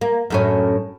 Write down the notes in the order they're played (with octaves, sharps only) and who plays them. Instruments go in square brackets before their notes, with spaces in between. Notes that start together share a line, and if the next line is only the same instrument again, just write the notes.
[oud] A#3
F#2 A2 C#4